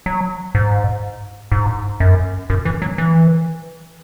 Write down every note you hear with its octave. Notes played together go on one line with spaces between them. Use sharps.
F#3
G#2
G#2
F#2
F#2
E3
F#3
E3